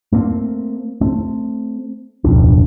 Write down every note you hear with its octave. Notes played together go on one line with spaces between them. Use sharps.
A3 A#3 C4
A3 C4
D1 B1 F2 D4